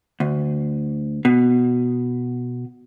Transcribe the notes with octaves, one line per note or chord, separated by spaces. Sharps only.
D2
B2